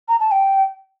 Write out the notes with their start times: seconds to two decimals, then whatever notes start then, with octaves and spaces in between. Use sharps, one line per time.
0.08 A#5
0.20 A5
0.31 G5